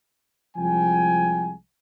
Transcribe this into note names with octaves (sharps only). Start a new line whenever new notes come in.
C2 F3 G#3 G5 G#5